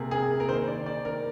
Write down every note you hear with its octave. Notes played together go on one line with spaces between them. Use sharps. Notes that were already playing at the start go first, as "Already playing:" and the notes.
Already playing: C3 A#3 G#4
A#3 G#4
A#3
A#4
D#3 C5
D#3 D5
D#3 D5
D#3 A#4